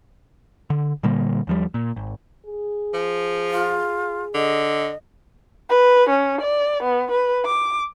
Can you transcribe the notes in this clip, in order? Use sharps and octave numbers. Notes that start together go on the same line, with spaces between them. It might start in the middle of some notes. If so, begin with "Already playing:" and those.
D3
A#2 D3 G3 A#3
D#2 F3 G3
A#2
G#1
G#4
F3
F4
D3 D#5
B4
C#4
D5
B3
B4
D6